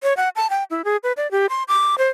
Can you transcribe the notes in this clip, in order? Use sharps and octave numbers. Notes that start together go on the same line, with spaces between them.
C#5
F#5
A5
G5
E4
G#4
B4
D5
G4
C6
D6
C5